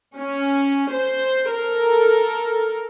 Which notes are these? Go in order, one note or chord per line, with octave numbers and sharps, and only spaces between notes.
C#4
C5
A4 A#4